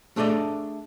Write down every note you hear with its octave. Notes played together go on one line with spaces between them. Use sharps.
A3 D4 G#4 A4 D5 D#5